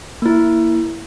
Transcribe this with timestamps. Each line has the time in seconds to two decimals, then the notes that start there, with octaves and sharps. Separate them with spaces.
0.22 A#3 E4